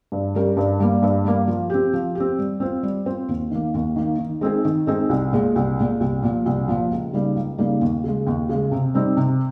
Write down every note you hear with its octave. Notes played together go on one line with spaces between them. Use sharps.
G2
G3 C#4 G4 A#4
G2
G3 A#3
G2
G3 A#3
F3
C4 G4
F3
C4 G4
G3
C4 F4 C5
G3
C4 F4 C5
D#2
D#3 A#3
D#2
D#3 A#3
D#3
G#3 C4 D#4 G#4
D#3
G#3 C4 D#4 G#4
C2
A#2 G#3
C2
A#2 G#3
C2
A#2 F3
C2
A#2 F3
C#2
C#3 G3 A#3 D#4
C#2
C#3 G3 A#3 D#4
D#2
C#3 G#3
D#2
C#3 G#3
C3
G3 C4 D#4
C3